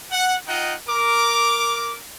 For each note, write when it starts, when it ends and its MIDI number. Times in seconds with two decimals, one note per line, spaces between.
0.11 0.35 78
0.47 0.73 63
0.47 0.73 65
0.47 0.73 75
0.47 0.73 78
0.47 0.73 79
0.88 1.99 70
0.88 1.99 86